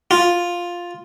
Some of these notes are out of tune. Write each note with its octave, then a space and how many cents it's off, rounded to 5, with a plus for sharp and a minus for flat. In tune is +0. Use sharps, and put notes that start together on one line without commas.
F4 +5